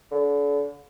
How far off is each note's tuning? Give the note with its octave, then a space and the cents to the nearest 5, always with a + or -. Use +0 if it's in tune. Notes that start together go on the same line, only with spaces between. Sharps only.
D3 -35